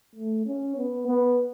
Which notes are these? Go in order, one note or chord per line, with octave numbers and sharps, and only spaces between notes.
A3
C#4
B3
B3